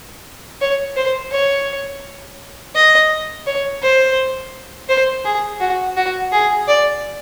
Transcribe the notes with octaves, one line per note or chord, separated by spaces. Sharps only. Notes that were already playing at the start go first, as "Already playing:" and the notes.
C#5
C5
C#5
D#5
C#5
C5
C5
G#4
F#4
F#4
G#4
D5